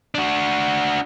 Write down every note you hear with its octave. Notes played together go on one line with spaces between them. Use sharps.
D4 F#4